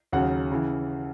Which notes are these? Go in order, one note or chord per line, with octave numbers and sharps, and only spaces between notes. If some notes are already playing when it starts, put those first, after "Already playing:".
D#2 C#3 F#3 F#5
C#3 E3